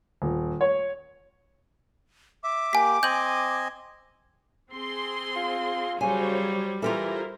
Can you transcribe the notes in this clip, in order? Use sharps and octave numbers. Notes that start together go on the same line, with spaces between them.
D#1
C#5
E5 D6
A#3 G4 G#5 B6
C4 D#5 G#5 G6 F#7
C4 G#4 C6
F4
C#3 F#3 G3 C5 C#5 G#5
E3 E4 F4 G4 A4 A#4 C5